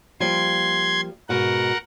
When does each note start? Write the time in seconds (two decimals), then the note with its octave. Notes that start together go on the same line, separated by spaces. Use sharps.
0.20 F3 G3 A#3 C6 G#6
1.29 G#2 B2 A#4 F#5